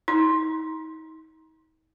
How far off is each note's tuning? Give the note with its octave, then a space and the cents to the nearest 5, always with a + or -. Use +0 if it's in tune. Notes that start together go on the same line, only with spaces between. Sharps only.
D#4 +40 C6 +5